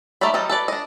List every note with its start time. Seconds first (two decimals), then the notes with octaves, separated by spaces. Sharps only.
0.21 D#3 A3 A#3 D5 B5
0.34 F#3 G3 A4 D#5
0.50 A4 B4 D5
0.68 D4 D#5